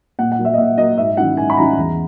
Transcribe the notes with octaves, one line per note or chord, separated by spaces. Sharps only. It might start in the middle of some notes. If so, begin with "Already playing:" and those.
A#2 F#5
F#5
F#3 A#3
E5
D#5
A#2 E5
F#3 A#3 D#5
G#2 E5
D#3 F#3 C#4 E4 F#5
G#2 G#5
B5
D#3 F#3 C#4 E4 A#5
E2